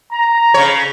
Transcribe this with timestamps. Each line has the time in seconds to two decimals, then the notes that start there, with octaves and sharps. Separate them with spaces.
0.12 A#5
0.54 C#3 C#5